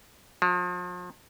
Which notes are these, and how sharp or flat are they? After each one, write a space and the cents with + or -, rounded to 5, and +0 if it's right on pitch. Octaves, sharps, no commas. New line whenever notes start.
F3 +40